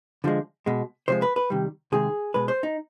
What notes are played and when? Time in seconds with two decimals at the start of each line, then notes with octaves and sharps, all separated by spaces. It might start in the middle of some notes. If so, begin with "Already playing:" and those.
0.24 D3 F3 G#3
0.66 B2 G#3
1.08 C3 F3 G#3 C5
1.22 B4
1.36 B4
1.50 C3 D#3 G3
1.92 C3 D#3 G#3 G#4
2.34 B2 G#3 B4
2.48 C5
2.63 D#4